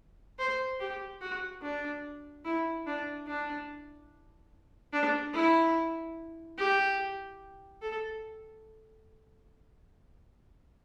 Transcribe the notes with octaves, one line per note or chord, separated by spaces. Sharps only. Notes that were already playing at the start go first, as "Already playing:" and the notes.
C5
G4
F#4
D4
E4
D4
D4
D4
E4
G4
A4